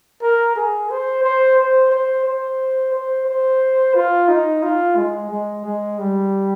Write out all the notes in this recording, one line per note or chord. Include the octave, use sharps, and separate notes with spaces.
A#4
G#4
C5
C5
C5
C5
C5
C5
C5
F4
D#4
F4
G#3
G#3
G#3
G3